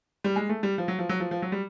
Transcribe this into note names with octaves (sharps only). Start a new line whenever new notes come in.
G3
G#3
A3
G3
F3
F#3
F3
F#3
F3
F3
F#3
G3